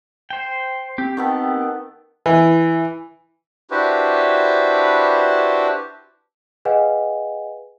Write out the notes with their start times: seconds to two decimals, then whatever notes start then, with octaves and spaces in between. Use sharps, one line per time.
0.30 C5 G5
0.98 C4 G4
1.17 D#3 B3 G4 A4
2.26 E3
3.71 D4 E4 F#4 G4 B4 C5
6.65 G#4 B4 D#5 F5 F#5 G#5